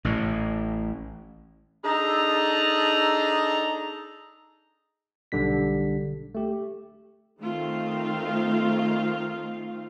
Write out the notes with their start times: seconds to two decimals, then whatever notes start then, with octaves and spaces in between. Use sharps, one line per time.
0.05 A1 A2
1.85 D4 D#4 G#4 A4 A#5
5.32 B1 D3 G3 B6
6.35 A3 G4
7.41 D#3 A3 C4 F4 F5